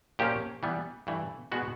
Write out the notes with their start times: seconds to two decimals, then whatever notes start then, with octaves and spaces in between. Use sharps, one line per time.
0.19 A#2 F3 A#3 C#4 G4
0.63 E3 G3 B3
1.07 G2 E3 A3
1.52 B2 G#3 B3 F#4